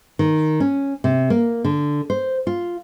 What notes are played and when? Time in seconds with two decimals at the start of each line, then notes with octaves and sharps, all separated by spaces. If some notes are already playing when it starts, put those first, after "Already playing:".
0.19 D#3
0.60 C#4
1.04 C3
1.30 A#3
1.64 D3
2.10 C5
2.47 F4